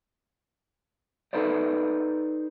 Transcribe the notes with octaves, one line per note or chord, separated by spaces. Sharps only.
D#4 A4 B4 C5 D5